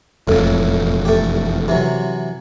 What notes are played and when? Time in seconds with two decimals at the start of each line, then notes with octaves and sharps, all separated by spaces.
0.28 E1 F2 A2
1.05 A3 G4
1.68 C3 E3 F#3